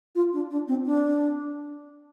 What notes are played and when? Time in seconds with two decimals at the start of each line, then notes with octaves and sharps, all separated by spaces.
0.15 F4
0.33 D4
0.51 D4
0.68 C4
0.85 D4